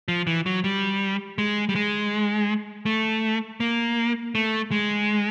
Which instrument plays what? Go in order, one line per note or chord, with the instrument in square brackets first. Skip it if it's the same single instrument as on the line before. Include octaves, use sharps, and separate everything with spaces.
[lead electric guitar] F3
E3
F#3
G3
G#3
G3
G#3
A3
A#3
A3
G#3